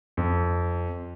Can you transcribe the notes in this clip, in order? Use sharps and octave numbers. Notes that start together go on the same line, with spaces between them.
F2